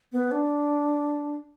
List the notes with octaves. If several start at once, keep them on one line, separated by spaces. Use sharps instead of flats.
B3
D4